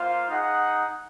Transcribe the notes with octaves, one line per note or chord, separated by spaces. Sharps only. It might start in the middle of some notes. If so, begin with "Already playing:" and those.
Already playing: A#3 F4 C5 F5
D#4 G#4 D#5 F#5